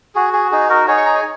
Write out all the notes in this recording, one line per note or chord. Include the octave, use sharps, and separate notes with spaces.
F#4 G#4
G#4
D#4 G#4
F#4 A#4
D#4 G#4 C#5
C#6
A#5
G#5